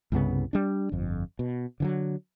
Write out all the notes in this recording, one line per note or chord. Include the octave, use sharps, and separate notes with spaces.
C2 G2 C#3 B3
G3 D4
G1 F2
B2
D3 E3 F#3